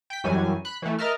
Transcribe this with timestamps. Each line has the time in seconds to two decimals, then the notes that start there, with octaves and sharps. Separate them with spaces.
0.10 G5 B6
0.24 F#2 E3 F#3 G3 G#5
0.65 B5 F#6
0.82 E3 A3
0.99 A#4 D#5 E5 A5 F6